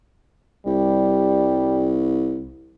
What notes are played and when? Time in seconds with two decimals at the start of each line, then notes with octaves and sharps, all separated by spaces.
0.67 C2 G3